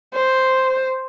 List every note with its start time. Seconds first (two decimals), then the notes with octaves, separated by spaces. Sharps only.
0.14 C5